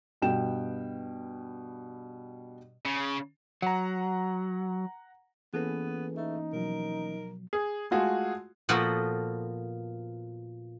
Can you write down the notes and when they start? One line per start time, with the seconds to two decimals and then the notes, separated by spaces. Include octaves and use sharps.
0.22 G2 B2 G5 E7
2.85 C#3
3.62 F#3 F#5 A#5
5.54 E3 A#3 B3 C#4 G#4 A4 B4
6.17 A3 D#4
6.53 B2 F3 F#3 A#4
7.53 G#4
7.91 G#3 A3 F4 F#4 G#4
8.69 A#2 F3 A#3 B3 F#4 A4